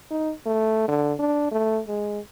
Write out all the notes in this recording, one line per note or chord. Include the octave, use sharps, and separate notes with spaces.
D#4
A3
D3
D4
A3
G#3